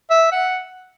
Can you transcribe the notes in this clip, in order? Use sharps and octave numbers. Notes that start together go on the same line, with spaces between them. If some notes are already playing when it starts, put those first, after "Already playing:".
E5
F#5